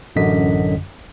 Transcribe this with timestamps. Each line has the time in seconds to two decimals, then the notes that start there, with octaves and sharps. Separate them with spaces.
0.16 A1 F#2 D3 D#5 B6